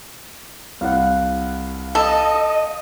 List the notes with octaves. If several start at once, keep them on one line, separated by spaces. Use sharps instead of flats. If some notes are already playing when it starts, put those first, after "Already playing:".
C2 F5 F#5
A4 D#5